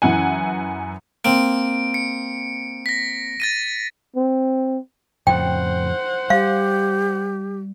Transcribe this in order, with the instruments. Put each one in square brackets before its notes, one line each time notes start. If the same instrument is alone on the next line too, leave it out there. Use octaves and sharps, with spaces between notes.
[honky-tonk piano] F#2 E3 F#5 G#5
[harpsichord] A#3 C4 [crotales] D7
[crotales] C#7
A#6 B6
A6 A#6 D#7
[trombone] C4
[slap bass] F2 A2 C#3 [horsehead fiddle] C5 F#5 [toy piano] G5
[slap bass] G3 [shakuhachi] G4 [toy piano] F5